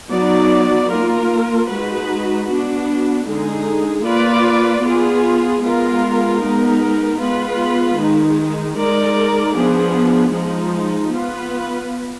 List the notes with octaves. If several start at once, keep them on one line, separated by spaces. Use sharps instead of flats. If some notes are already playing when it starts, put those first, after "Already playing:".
F#3 B3 D#4 F#4 D5
A#3 F4 A#4
G#3 D#4 F#4 B4
B3 D4 F#4
D3 G#3 D#4 G#4
A#3 F4 B4 D5
B3 F4 G#4
G#3 B3 F4 A#4
G#3 B3 D#4 A#4
G#3 B3 F4 B4
D#3 G#3 D#4
G#3 D#4 A#4 D5
F3 B3 D4 G#4
F3 G#3 D#4
B3 F4 B4